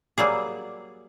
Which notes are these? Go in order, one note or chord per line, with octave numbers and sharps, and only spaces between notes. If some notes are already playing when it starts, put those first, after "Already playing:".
F#3 G3 A#3 G#4